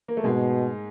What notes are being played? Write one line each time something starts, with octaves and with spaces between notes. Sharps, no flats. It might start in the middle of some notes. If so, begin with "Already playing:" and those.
A#3
A3
G#2 B2 G#3